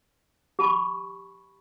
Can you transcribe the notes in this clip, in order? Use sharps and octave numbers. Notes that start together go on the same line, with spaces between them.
G4 A5 B5 C#6